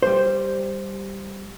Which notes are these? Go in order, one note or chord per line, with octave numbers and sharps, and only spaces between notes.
G3 C5